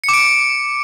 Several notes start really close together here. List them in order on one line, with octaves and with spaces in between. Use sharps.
C#7 D6 D7